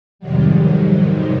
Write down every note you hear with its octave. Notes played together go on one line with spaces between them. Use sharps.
F2 G#2 C3 D#3 F#3 G3